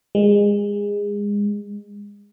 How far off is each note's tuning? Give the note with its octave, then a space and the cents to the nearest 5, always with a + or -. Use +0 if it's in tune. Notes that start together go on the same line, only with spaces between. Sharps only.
G#3 -25